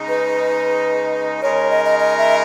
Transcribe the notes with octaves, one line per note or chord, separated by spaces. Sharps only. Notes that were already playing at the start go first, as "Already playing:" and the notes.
Already playing: C#3 G#3 D#4
B4
C#3 G#3 D#4 A#4 C#5
C#5
D#5
D#5
D#5
E5